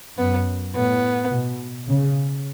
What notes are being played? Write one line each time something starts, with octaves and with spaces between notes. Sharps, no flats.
F#2 B3
A2 B3
B2
C#3